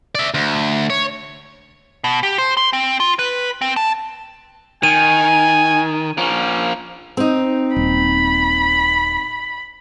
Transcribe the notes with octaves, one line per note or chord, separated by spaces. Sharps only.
D5 E5
D2
C#5
B2
G4
C5
C6
C4
F4
B4
C4
A5
D#3 G#5 D#7
F3 A#3 C#4
C4 D#4
D#1 B5